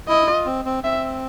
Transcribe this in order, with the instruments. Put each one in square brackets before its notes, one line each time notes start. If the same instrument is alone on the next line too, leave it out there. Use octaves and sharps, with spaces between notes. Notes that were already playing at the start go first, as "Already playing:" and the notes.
[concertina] E4 [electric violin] D#5
[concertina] F4
C4
C4
[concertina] C4 [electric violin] E5